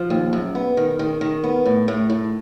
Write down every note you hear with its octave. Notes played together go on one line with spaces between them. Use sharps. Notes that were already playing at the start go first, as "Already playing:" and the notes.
Already playing: F3
D#2
F#2
B3
D#3
D#3
D#3
B3
A2
A2
A2